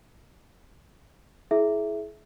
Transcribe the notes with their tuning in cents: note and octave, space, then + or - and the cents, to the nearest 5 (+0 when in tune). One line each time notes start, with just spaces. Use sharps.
E4 +0 G#4 +35 E5 +0